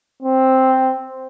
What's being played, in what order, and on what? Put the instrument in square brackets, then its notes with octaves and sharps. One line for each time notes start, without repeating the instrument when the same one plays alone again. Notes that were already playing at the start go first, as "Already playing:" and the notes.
[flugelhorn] C4